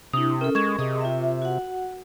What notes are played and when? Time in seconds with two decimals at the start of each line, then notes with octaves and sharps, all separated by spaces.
0.13 C3 D4 E4 D#6
0.41 C#4 A4 A#4
0.55 G#3 C#6 G#6 E7
0.79 C3 G#4 D#5 D#6
1.01 F4 E5
1.42 F#4 F#5